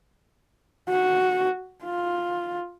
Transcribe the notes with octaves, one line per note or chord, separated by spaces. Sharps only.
F#4
F4